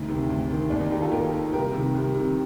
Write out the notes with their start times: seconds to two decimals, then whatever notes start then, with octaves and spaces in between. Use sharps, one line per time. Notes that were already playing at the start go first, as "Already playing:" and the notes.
Already playing: D2 D#4
0.08 C3 D#3
0.30 D2
0.50 C3 D#3
0.70 D#2 D4
0.80 D#4
0.91 D#3 D#4 G4
1.02 F4 A4
1.11 D#2 G4 A#4
1.32 D#3
1.53 C2 G4 A#4
1.73 C3 D#3
1.95 C2
2.15 C3 D#3